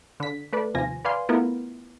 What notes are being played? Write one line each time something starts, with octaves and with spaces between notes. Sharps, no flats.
D3 B6
A3 B4 D5
D#2 C3 F3 F4 G#5 A#6
B4 D5 F5 G#5 C6
A3 B3 E4 F4 A#4